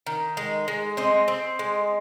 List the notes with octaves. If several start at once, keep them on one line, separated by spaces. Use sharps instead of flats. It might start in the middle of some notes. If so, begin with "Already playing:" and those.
D#3
G#3
G#3
C4 D#5
C4
G#3